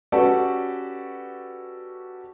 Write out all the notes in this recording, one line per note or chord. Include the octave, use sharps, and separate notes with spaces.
C#4 F#4 G4 A4 B4 D5